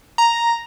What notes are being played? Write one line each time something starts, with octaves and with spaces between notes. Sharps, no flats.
A#5